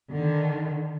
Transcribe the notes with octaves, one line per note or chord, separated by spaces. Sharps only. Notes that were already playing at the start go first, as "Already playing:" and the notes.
D3 D#3